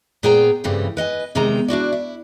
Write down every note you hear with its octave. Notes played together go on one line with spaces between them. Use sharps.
A#2 B3 G#4 C5 G5 A#5
G2 C#3 E3 G3 A3 C4
B4 D#5 F#5 G#5
E2 C3 D#3 G#3 A#5
D4 E4 F#4 D5
E4